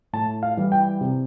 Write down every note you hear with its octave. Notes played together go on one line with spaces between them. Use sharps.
A2 A5
F5
E3 G3
G5
C3